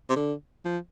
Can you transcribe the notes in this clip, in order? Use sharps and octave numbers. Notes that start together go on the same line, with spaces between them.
C3
D3
F3